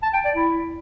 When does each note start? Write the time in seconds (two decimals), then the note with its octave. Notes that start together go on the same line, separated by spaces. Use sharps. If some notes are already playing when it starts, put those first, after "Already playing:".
0.03 A5
0.13 G5
0.25 D5
0.36 E4